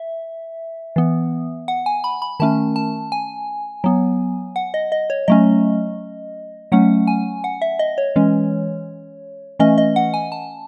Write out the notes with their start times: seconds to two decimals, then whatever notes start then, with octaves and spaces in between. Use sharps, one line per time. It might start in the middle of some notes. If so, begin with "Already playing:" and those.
Already playing: E5
0.96 E3 B3
1.68 F#5
1.86 G#5
2.04 B5
2.22 B5
2.40 D#3 A3 C#4 A5
2.76 A5
3.12 G#5
3.84 F#3 B3
4.56 F#5
4.74 D#5
4.92 D#5
5.10 C#5
5.28 F#3 A3 C#4 D#5
6.72 F#3 A3 C#4 F#5
7.07 G#5
7.44 F#5
7.62 E5
7.79 D#5
7.98 C#5
8.16 E3 G#3 C#4
9.60 E3 A3 C#4 D#5
9.78 D#5
9.96 F#5
10.14 G#5
10.32 A5